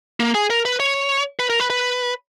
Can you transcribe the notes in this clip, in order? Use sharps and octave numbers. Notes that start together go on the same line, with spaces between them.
A#3
G#4
A#4
B4
C#5
B4
A#4
B4
B4